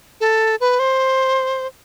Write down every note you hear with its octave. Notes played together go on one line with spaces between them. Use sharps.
A4
B4
C5